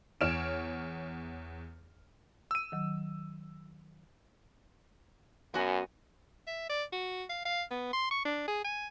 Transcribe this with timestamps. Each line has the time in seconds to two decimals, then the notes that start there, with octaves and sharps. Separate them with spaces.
0.21 E2 C#5 F6 D7 E7
2.51 E6 D#7
2.72 D#3 F#3
5.54 F#2 B3 F#4 G#5
6.47 E5
6.70 D5
6.93 F#4
7.29 F5
7.45 F5
7.71 B3
7.93 C6
8.11 C#6
8.25 D4
8.48 G#4
8.65 G#5